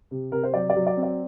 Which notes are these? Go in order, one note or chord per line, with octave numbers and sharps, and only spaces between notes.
C3
C3 A#4
C5
F#3 D5
D5
F#3
D5
C4
D5